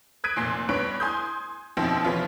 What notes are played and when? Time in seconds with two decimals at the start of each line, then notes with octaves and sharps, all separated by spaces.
0.24 D#6 F#6 G#6 B6 D7 D#7
0.36 F1 A#2 C6 C7
0.69 G2 B3 C#5 F#6 D7
1.00 G#5 C6 D#6 G6
1.77 F#2 B2 D#3 F3 C4
2.04 C3 E3 F3 B3 C#4 F4